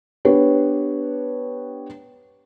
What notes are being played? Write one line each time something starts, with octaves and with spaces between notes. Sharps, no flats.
B3 D4 G4 B4 C#5